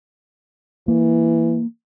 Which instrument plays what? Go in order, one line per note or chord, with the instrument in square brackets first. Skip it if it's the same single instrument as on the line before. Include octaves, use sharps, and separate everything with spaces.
[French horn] E3 [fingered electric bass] A#3